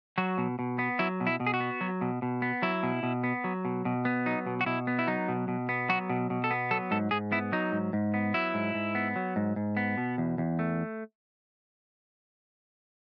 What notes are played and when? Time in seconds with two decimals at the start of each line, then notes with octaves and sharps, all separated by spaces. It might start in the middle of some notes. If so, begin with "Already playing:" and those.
0.18 F#3 F#4
0.38 B2
0.59 B2
0.79 B3
0.99 F#3 E4
1.20 B2
1.27 E4
1.40 B2
1.47 G#4
1.54 F#4
1.60 B3
1.81 F#3
2.01 B2
2.22 B2
2.42 B3
2.62 F#3 E4
2.83 B2
3.03 B2
3.24 B3
3.44 F#3
3.65 B2
3.85 B2
4.05 B3
4.26 F#3 D#4
4.47 B2
4.61 F#4
4.66 B2 E4
4.87 B3
4.99 E4
5.07 F#3 D#4
5.28 B2
5.48 B2
5.69 B3
5.89 F#3 F#4
6.09 B2
6.30 B2
6.44 A4
6.51 B3
6.71 F#3 A4
6.91 G#2 A4
7.11 G#2 G#4
7.32 B3 E4
7.52 F#3 D#4
7.72 G#2
7.93 G#2
8.14 B3
8.34 F#3 E4
8.54 G#2
8.74 G#2
8.95 B3
9.16 F#3
9.36 G#2
9.56 G#2
9.77 B3
9.98 B2
10.18 E2
10.38 E2
10.59 A3